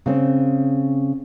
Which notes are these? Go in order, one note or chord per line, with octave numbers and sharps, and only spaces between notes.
C#3 C4